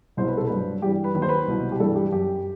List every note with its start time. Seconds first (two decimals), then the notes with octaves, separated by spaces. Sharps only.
0.17 C2 B2 F#3 C5
0.28 B4
0.37 A4
0.47 G2 F#3 B4
0.82 G2 E3 G3 G4
1.04 B4
1.14 D#2 D#3 F#3 B4
1.22 C5
1.29 B4
1.48 C2 B2 F#3
1.72 G4
1.80 G2 E3 G3 A4
1.96 G4
2.12 F#2 F#3 G4